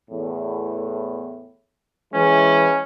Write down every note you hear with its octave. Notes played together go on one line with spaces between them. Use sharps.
E2 A2
E3 G#3 C#4